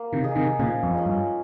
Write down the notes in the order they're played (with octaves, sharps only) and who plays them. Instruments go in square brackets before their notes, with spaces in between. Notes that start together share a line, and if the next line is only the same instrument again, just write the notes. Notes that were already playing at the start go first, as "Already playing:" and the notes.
Already playing: [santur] A#3
[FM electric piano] C3 D#3
[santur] D#4 G#4
[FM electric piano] C3 D#3
[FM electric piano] A#2 C#3 [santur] F3
[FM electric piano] F2
[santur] G#3 C#4
[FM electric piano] G2